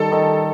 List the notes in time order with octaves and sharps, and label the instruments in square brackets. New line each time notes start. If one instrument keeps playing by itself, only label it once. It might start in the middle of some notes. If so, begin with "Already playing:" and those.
Already playing: [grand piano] D#3 G3 [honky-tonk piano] A4
[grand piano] D#3